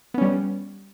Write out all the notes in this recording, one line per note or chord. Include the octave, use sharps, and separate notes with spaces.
G3 B3 C#4